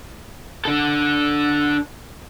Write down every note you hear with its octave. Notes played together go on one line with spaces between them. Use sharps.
D4 A4